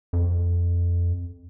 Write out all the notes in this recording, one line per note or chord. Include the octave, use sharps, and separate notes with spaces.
F2